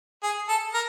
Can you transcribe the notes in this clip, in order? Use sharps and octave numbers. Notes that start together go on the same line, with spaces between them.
G#4
A4
A#4